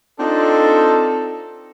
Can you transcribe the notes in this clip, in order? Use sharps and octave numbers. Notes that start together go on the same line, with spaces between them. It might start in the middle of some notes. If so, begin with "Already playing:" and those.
C4 D4 D#4 F4 A4